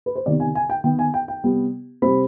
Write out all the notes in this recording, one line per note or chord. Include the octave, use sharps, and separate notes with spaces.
B4
C5
C3 D#3 B3 D5
G#5
G#5
G5
D#3 B3 G5
G#5
G5
G5
C3 G3 B3
C3 G3 C4 B5